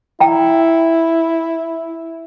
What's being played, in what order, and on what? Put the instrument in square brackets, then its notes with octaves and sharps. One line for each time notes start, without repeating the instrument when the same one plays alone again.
[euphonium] E4 [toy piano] G5 A#5